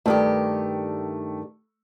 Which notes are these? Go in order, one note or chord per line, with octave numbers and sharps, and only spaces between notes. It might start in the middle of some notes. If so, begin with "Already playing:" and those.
G2 D#3 A3 G4